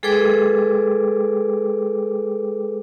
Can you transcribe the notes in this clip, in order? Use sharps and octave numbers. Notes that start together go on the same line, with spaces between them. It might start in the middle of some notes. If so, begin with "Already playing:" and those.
G#3 G#4 A4 B4 G5 D6